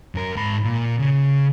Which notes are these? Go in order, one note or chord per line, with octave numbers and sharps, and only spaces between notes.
F#2 A#4
G#2 B5
A#2
C#3